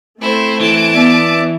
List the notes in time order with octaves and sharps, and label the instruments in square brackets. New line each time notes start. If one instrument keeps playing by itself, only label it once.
[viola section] A3 [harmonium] C4 [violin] E4 C5
[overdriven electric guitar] E3 [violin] A5 D7
[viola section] B3 [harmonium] D5 E5